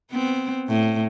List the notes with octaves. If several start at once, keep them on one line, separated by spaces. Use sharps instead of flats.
B3 C4
A2